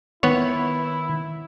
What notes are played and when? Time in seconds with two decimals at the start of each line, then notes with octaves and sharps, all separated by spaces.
0.23 D#3 B3 E4 C#5